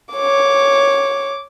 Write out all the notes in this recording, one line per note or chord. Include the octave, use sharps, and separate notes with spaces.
C#5 D6